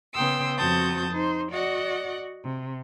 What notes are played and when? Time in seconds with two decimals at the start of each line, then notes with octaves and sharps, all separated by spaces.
0.13 C#3 B3 G5 C6 D#6 E6
0.57 F2 C4 F#4 A5 D#6 G6
1.11 D#4 C5
1.51 F#4 D5 D#5 F#5
2.43 C3